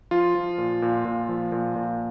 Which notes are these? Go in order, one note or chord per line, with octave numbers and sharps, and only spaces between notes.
F3 F4
F3
A#2
A#2
A#2
F3
A#2
A#2